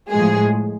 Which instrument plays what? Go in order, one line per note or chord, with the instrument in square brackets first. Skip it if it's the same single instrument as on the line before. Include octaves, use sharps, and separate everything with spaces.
[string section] A2 F3 G#3 G#4